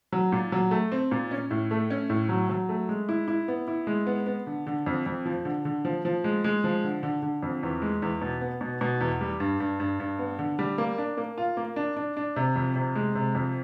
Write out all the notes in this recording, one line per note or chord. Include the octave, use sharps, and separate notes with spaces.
F#3
A#2
F#3
A3
C4
A#2
C#4
A2
A3
C#4
A2
F#3
F#3
A3
G#3
E4
E4
B3
E4
G#3
B3
B3
D3
D3
F2
F2
F3
D3
D3
F3
F3
G#3
G#3
F3
D3
D3
D3
F2
E2
G#3
E2
B2
B3
B2
B2
E2
G3
G2
G2
G2
G2
B3
D3
G3
A#3
D4
A#3
F4
A#3
D4
D4
D4
C3
F2
C3
G#3
C3
F2